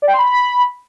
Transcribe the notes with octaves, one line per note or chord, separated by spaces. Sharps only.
D5
G5
C6
B5